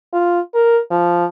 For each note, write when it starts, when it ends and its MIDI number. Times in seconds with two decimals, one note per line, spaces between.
0.13 0.40 65
0.54 0.80 70
0.91 1.25 53